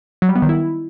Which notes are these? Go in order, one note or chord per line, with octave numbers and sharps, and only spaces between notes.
F#3
G3
B3
D#3
E4